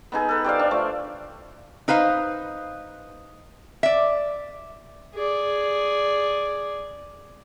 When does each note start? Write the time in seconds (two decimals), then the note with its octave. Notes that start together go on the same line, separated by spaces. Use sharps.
0.12 B3 D#4 G#4 A4
0.29 A4 B4
0.44 G4 C5 D5 F5
0.59 D4
0.71 F3 A3
1.88 D#4 B4 C5 F5
3.83 D5 E5
5.14 G#4 D5